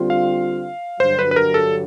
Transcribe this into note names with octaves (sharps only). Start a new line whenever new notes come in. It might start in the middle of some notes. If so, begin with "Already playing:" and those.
Already playing: D3 G3 C4 F4
F5
G2 D3 F#3 C5
B4
B4
A#4
A4